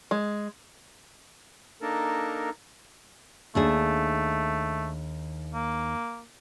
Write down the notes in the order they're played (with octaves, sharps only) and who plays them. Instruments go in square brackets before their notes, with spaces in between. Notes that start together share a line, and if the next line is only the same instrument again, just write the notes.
[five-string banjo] G#3
[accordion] A#3 D4 D#4 A4 A#4
[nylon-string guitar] D#2 D4 G#4 [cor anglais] A3
[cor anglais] A#3